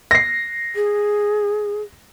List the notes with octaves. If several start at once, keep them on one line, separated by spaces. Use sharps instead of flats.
A#6 C7
G#4